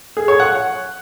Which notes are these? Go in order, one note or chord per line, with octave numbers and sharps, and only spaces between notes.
G#4
C#5
F#5